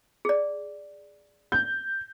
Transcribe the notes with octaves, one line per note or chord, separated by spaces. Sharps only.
G#4 D5
G6